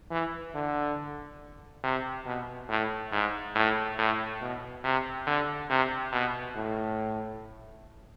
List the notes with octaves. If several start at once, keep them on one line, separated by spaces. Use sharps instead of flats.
E3
D3
C3
B2
A2
G#2
A2
A2
B2
C3
D3
C3
B2
A2